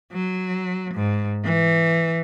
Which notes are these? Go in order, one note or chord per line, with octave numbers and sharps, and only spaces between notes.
F#3
G#2
E3